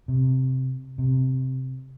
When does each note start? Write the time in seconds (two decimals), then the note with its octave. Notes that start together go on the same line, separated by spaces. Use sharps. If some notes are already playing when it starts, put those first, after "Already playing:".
0.08 C3
0.98 C3